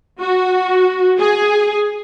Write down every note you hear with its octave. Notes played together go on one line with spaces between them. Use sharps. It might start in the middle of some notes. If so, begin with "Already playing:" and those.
F#4
G#4